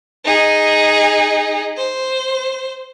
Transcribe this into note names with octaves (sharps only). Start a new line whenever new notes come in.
D#4 G#4
C5